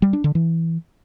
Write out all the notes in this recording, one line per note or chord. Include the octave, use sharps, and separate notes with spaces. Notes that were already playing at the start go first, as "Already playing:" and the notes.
G3
D4
D3
E3